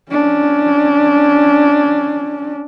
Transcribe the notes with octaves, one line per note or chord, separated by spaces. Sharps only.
C#4 D4